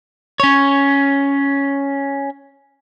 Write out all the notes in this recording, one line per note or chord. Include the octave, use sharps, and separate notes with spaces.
C#4 C#5